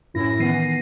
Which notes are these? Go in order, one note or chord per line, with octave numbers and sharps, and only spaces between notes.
F#2 A2 E4 A#6
D#3 E3 B3 A#6 C7 D#7